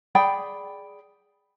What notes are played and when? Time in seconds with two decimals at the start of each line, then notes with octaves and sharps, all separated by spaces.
0.15 G#4 D5 G5 B5